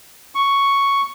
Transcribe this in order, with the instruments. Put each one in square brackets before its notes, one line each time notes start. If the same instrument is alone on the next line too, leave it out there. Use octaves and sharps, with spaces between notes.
[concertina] C#6